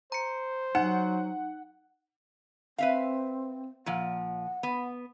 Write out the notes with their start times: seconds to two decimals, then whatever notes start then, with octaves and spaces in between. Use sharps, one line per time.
0.12 C5 A#5 C#7
0.75 F#3 D#4 F#5
2.78 C4 B4 E5 F5
3.86 A#2 F3 F#5
4.63 B3